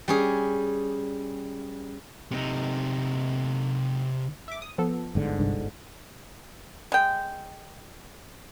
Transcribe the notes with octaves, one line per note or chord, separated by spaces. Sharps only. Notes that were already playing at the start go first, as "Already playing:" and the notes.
G3 C#4 G#4
C3 D#4
E5 D6
D#6
F3 B3 A4
G1 G#2 D3
C2 G2
G#3 G5